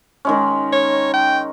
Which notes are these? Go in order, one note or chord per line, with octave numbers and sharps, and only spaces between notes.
D#3 G#3 C#4
C#5
G5